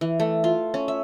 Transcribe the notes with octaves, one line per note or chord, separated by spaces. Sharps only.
E3
A3
F4
C#4
E5